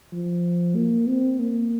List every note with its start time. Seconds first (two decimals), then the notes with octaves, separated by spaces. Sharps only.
0.13 F3
0.76 A#3
1.07 C4
1.39 A#3